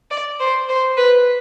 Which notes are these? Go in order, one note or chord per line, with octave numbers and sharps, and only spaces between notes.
D5
C5
C5
B4